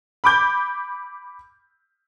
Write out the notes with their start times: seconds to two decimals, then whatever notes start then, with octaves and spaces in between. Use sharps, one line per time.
0.24 B5 D6 G6